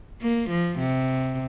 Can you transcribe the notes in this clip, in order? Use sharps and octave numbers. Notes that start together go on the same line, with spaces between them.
A#3
F3
C3